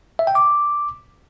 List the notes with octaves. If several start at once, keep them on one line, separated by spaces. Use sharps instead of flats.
E5
G5
D6